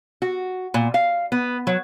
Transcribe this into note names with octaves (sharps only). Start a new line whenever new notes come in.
F#4
A#2
F5
B3
F#3